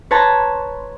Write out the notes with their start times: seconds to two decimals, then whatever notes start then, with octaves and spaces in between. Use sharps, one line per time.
0.11 B4 C#5 A5 A#5 C6